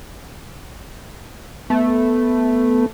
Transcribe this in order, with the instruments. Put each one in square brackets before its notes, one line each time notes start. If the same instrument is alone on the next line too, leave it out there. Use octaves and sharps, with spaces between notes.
[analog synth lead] A3 [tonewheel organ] B3